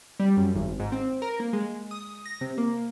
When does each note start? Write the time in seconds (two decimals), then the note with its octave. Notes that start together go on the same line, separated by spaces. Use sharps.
0.20 G3
0.37 F#2
0.55 G#1
0.80 G#2
0.92 C4
1.22 A#4
1.40 A#3
1.53 G#3
1.91 D#6
2.26 A#6
2.41 C3
2.58 A#3